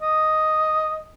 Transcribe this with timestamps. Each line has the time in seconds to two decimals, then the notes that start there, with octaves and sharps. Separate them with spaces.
0.02 D#5